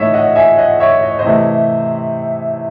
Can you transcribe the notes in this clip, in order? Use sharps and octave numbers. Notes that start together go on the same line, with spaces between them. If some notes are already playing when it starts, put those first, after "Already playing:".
Already playing: A2 E3 A3 D#4 C#5 D#5 E5
D#5 F#5
E5 G#5
D#5 F#5
C#5 E5
D#5
C#5
C5 D#5
C3 E3 A3